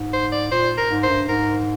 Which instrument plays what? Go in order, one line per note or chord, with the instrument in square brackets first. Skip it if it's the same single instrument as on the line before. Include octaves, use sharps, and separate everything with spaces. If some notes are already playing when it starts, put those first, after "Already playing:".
Already playing: [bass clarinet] G#2
[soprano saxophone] C5
D5
[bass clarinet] A#2 [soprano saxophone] C5
[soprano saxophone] A#4
[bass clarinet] G#2
[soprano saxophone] C5
[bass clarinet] G2
[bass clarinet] G#2 [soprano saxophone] A#4